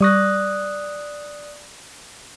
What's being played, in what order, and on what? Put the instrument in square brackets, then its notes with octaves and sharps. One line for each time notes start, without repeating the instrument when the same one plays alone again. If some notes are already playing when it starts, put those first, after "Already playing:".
[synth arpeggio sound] G3 C#6 A#6 [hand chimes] D5 D#6 F#6